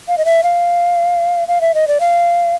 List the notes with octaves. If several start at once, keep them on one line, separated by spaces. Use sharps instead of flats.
F5
D#5
E5
F5
F5
E5
D#5
D5
F5